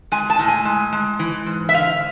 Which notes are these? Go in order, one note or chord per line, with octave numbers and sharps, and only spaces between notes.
G#3 G#5
A5
A2
G#5
G#3
G#3
E3
G#2
E5
D3 F5